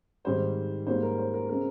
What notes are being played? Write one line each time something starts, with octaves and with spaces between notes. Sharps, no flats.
G#2 D#3 G3 C4 C5
G#2 G3 A#3 C5
A#4
C5
A#4
C#3 G#3 C4 A#4